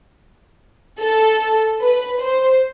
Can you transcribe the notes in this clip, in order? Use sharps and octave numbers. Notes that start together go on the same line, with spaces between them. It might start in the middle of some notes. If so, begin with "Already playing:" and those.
A4
B4
C5